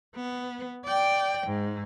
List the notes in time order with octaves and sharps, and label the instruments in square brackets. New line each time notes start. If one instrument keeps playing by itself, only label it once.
[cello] B3
D5 G5
G#2